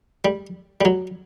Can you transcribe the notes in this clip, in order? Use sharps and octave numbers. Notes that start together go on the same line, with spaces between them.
G3
G3
F#3